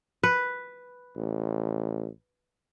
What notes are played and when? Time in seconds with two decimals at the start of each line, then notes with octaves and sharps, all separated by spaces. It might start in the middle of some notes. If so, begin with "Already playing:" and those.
0.23 B4
1.16 A1